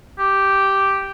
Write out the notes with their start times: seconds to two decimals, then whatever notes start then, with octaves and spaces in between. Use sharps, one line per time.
0.19 G4